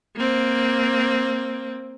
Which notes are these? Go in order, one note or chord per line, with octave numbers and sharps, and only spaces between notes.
A#3 C4